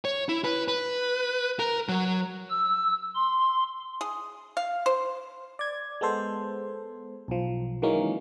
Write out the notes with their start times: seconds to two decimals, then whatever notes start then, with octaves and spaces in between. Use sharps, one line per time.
0.05 C#5
0.29 E4
0.44 B4
0.68 B4
1.59 A#4
1.89 F#3
2.50 E6
3.15 C6
4.01 G#4
4.57 F5
4.86 C5
5.59 D5 G#6
6.01 G#3 B3 A4 C5
7.28 B1 F3
7.82 D#3 E3 F#3 G#3 A#3 C#4